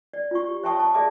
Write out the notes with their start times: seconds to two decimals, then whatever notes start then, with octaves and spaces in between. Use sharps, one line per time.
0.14 D5
0.31 F4 C#6
0.48 G4
0.64 C#5 E5 G5 A5 C#6 D#6
0.79 C#5 A5
0.94 G#4 D5 E5 A5 D6